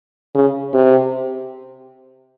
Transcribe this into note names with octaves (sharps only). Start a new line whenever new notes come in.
C#3
C3